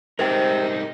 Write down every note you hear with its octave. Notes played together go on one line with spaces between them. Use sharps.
C2 G#2 C3 D#4 A#4 C5 G5